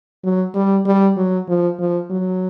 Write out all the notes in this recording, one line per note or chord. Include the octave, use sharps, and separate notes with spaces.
F#3
G3
G3
F#3
F3
F3
F#3